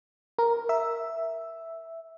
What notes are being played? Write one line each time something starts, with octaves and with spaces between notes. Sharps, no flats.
A#4
E5